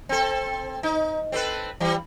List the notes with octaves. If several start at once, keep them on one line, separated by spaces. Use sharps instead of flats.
C4 A4
D#4
C4 A4 B4
E3 G3